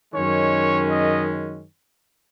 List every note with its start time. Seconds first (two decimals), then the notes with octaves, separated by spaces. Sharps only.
0.14 F#2 D#3 G#3 C#4 C#5
0.90 D#5